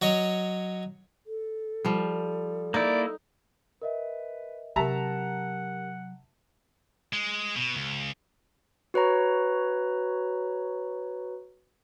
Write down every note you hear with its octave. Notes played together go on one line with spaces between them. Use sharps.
F#3 C#5 D#5
A4
F3 G3
A#3 D#4 E4 D5
A#4 B4 D#5 E5
C3 F#3 G4 A#4 E5 F#5 A5 A#5
G#3
B2
C#2
F#4 B4 C#5 A#5